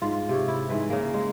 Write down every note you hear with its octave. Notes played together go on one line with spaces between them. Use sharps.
G#2 F4
C3 C#5
E4
G#2 E3 B4
C#3 A#3
G#3